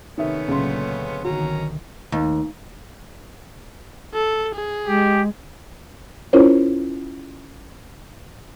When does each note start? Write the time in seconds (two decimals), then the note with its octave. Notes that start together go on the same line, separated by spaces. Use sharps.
0.18 C3 D#3 A3 B3 C#4 E5
0.48 C#2 A#2 D3 F#3 C6
1.24 B1 D3 D#3 C#4 F#4 A#5
2.12 D#2
4.14 A4
4.55 G#4
4.88 G#3 G4
6.33 C#4 E4 F4 A#4 C5 C#5